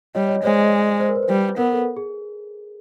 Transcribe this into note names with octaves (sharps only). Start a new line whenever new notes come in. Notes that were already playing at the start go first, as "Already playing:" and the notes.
G3 C#5 D#5
C#5 D#5
G#3 C5 D5
C5
A#4
B4
C5
G3 B4
B3 A#4
A4
G#4